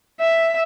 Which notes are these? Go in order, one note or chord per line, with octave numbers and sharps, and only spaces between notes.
E5